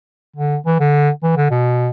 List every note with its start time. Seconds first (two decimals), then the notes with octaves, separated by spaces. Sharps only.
0.37 D3
0.66 E3
0.80 D3
1.23 E3
1.37 D3
1.51 B2